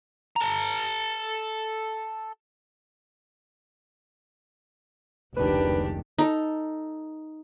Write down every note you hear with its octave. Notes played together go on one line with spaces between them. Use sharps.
A4 A#5
F1 C#2 D#3 D4 G4 B4
D#4 A4